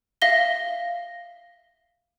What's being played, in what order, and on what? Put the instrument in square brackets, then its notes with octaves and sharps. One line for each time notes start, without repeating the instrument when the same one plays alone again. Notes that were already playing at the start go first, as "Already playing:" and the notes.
[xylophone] E5 F5 A#6 G7